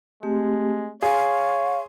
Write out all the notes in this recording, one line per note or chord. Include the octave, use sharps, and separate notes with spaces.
G#3 A3 C4 G4
G#4 C#5 F5 C6